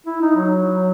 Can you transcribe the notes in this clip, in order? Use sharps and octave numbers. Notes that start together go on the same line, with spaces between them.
E4
D#4
F#3